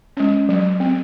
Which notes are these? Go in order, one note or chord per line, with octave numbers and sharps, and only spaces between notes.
G#3 C#4
F#3
C4